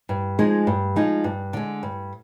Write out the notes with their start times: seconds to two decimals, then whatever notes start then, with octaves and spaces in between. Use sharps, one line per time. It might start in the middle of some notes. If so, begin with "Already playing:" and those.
0.09 G2
0.39 F3 G#3 D#4 G#4
0.67 G2
0.96 F3 G#3 D#4 G#4
1.24 G2
1.53 D3 G#3
1.83 G2